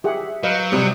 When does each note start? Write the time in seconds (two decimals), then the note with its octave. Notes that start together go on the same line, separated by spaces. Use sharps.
0.04 G4 G#4 E5 F#5
0.43 F#3 B4 D#5 F5 G6
0.72 C3 G3 D#6